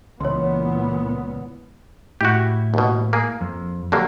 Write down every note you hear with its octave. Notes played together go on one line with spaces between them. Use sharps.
C#2 A#2 E3 B3 C#5 C6
A2 E4 F#4 G4
D#2 B2
A#3 G#4
F2
D3 F#3 A#3 G4